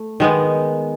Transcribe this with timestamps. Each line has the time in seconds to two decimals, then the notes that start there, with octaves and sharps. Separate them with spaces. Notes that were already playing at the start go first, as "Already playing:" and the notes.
Already playing: A3
0.20 D#3 G#3 B3